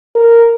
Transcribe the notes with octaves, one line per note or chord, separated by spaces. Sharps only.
A#4